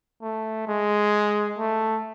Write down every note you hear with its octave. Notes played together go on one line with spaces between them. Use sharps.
A3
G#3
A3